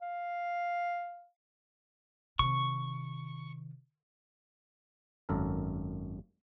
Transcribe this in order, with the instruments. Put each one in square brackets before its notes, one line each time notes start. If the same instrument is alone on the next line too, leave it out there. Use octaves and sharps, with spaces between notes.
[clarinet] F5
[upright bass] C3 D#3 [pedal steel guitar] C#6
[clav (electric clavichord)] G#1 F#2 A4 A#4